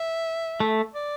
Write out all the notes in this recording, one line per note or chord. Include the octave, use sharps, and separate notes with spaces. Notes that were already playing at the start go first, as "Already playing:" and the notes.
Already playing: E5
A3
D5